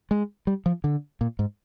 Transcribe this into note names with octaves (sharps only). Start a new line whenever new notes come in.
G#3
G3
F3
D3
A#2
G#2